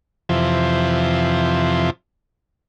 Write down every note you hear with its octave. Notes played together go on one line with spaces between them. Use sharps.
F2 C3 E3 F3